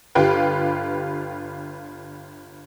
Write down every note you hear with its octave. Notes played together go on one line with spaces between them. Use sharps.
G1 F4 G4 B4 G5